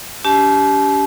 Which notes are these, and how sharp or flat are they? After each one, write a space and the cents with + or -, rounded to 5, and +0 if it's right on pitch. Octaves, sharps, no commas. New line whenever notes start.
D4 -45 G4 -10 A5 -40